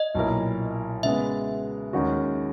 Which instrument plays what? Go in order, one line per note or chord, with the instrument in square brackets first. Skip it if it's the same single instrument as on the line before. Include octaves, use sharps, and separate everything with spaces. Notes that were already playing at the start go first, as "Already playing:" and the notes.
Already playing: [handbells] D#5
[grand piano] B1 A#2 A#3 E4 A#4
[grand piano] C#3 G#3 B3 [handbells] E5
[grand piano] D#2 D#3 G#3 C#4 F#4